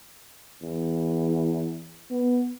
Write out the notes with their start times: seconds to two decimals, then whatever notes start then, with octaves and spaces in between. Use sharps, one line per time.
0.63 E2
2.11 B3